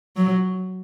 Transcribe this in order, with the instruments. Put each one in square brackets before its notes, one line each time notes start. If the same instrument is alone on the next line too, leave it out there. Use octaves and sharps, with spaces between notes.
[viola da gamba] F#3